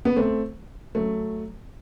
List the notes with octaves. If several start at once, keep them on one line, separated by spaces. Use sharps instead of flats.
B3
A3 C4
F#3 A3